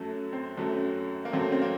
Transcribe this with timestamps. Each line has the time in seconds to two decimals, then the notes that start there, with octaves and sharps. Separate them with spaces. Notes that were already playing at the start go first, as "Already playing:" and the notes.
Already playing: F#2 F#3 A3
0.33 C4
0.57 F#2 F#3 A3
1.25 A#3
1.33 F#2 F#3 A3 C4
1.52 C4
1.62 A#3